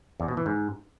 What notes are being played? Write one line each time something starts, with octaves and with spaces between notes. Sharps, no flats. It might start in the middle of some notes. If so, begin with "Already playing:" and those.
E2
B2
E3
G#2